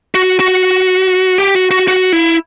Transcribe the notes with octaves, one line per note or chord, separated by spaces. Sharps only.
F#4
F#4
G4
F#4
F#4
F#4
E4